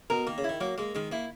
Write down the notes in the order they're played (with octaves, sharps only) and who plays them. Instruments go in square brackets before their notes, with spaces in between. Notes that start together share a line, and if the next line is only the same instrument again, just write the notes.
[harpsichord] B2 [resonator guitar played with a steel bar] A#4
[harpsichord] D#3 [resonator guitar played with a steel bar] A#3
[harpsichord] C#3
[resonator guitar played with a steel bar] E4
[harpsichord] D#3
[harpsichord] F#3 [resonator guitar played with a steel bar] A#3
[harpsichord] G#3 [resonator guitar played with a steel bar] A#3
[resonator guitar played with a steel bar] D#3 [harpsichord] G#3
[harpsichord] A#3 [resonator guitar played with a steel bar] E4